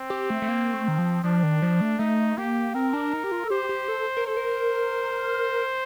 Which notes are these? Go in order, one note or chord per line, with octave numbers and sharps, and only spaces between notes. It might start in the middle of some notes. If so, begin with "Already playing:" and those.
Already playing: C4
G4
A3
A3
A#3
A3
D#3
F3
F3 D4
D#3
F3
A3
A3 D#4
A#3 G4
C4 A#4
D4
D#4
G4
F4
A4
G4 C5
G4
A4
A#4
A4 C5
A#4